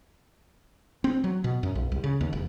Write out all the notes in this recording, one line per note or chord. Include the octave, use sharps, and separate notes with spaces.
C4
F#3
B2
F#2
B1
C2
C#3
D#2
E1